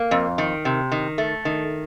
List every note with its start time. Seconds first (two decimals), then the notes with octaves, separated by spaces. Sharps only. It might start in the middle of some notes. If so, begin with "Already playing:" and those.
Already playing: A#3
0.11 F2
0.38 D#3
0.65 C3
0.92 D#3
1.18 A3
1.45 D#3